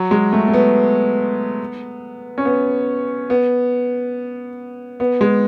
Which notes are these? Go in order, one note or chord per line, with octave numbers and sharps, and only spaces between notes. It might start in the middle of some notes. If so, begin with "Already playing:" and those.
Already playing: F#3
G#3
A3
A3
B3
C#4
B3
B3
B3
G#3